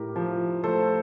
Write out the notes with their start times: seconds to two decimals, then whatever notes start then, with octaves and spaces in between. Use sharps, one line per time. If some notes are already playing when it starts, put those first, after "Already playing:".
Already playing: A2 G4 A#4
0.16 F3
0.64 A3 A4 C5